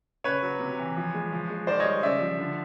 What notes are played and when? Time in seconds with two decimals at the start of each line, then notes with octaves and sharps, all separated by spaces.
0.24 C#3 B4 C#5
0.43 F#3
0.60 C3
0.79 E3
0.96 F3
1.14 G#3
1.32 F3
1.50 G#3
1.67 D#3 C5 D5
1.80 C#5 D#5
1.85 G3
2.03 C#3 D5 E5
2.21 F3
2.39 D3